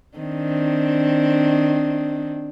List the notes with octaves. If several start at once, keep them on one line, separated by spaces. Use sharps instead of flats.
D#3 C4 D4